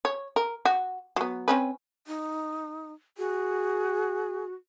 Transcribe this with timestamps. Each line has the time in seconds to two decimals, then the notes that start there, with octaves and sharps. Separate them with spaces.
0.05 C#5
0.36 A#4
0.65 F#4
1.16 F#3 B3
1.48 C4 C#4 B4
2.07 D#4
3.18 F#4 G#4